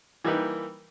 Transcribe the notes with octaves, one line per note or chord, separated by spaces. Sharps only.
E3 G3 A#3 D#4 G4 B4